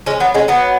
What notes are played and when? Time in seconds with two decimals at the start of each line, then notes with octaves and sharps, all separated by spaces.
0.06 G#3 C#4
0.20 F#3 B3
0.34 G#3 C#4
0.48 F#3 B3